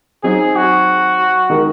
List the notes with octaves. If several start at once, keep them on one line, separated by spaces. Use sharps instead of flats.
F#3 C4 D#4 G#4
F#4
D#3 G#3 D#4 A#4